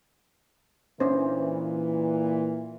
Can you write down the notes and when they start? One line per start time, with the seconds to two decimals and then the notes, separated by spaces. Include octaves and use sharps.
1.00 A#2 E3 C#4 D4 C5